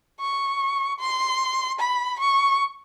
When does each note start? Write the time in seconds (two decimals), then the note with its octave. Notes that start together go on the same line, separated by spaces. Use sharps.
0.20 C#6
1.00 C6
1.79 B5
2.19 C#6